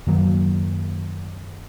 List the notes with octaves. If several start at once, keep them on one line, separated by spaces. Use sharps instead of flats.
F#2 D#3 F#3 A#3